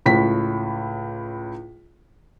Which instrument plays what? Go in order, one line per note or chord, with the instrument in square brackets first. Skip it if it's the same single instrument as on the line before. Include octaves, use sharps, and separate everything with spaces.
[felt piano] C#2 A2 B6